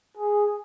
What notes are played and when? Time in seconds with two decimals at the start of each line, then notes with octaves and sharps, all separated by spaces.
0.17 G#4